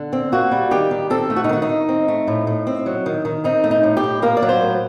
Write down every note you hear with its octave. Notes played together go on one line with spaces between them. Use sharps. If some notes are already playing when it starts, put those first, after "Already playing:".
Already playing: D3
C4
A#3 F#4
G3
D#3 G4
D#3
C4 A4
A3
F#4
D#4
D#3 F#4
D#4
D#3
C4
A3
A2
A2
C4
F#3
D#3
D#3
C4 D#4
A3
D#4
A2
G4
A2
A#3 A#4
D5
F#3
C5
A2